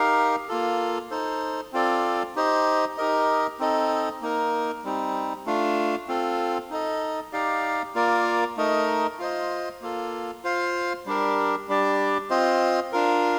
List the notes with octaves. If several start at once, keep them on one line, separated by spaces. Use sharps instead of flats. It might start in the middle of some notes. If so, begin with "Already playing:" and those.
Already playing: D#4 G4 A#4 F5
A#3 F4 A4
D#4 A4 C5
C4 F4 A4 D5
D#4 G4 C5 D#5
D#4 G4 A#4 D#5
C4 D#4 A4 D#5
A#3 D#4 A#4
G3 C4 D#4
A3 D4 F4
C4 F4 A4
D#4 A4 D#5
D#4 G4 D5 F5
A#3 F4 A#4 D5
A3 D#4 A#4 D#5
F4 C5 D#5
A#3 F4 A4
F4 C5 F5
G3 D4 G4 A#4
G3 D4 G4 D5
C4 F4 C5 D#5
D4 F4 A#4